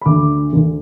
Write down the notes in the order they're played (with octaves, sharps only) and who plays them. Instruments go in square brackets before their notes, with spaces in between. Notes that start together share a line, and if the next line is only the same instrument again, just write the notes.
[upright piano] B5
D2 D3 D6
D2 D3